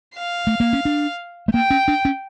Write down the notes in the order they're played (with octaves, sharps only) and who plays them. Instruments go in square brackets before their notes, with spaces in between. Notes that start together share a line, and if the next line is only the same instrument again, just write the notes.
[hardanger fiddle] F5
[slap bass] A3
A#3
C#4
D4
A3
[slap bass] A#3 [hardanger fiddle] G5
[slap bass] C#4
D4
C#4